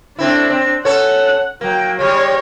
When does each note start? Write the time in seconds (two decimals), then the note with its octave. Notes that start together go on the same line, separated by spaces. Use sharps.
0.19 A3 C4 D4 E4
0.50 C4
0.85 C#4 A4 C#5 F#5
1.61 F#3 A#3 G5
1.99 G3 G#3 C#5